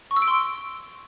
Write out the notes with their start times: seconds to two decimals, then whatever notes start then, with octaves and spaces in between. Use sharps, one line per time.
0.11 C#6
0.16 E6
0.22 D7
0.28 C6